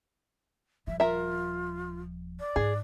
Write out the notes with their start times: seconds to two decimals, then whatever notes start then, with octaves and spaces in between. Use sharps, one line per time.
0.87 D#1 F3 E5
1.00 F4 A#4 E5
2.40 D5
2.56 G#2 D#4 G#4